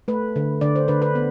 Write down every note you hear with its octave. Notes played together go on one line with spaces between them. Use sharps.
A3 B4
D3
D3 D5
C5
D3 B4
B4
B3